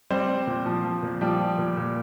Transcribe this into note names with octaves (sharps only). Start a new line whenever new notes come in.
G3 C4 C5
G3
A#2
F3
F3
A#2
F3 G3 G4
F3
A#2
A#2